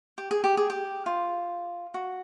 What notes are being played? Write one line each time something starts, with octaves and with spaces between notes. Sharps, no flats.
G4
G#4
G4
G#4
G4
F4
F#4